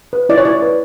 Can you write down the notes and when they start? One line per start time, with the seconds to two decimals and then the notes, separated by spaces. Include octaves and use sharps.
0.13 B4
0.29 E4 D5
0.38 C#5
0.45 E4 D5
0.62 B4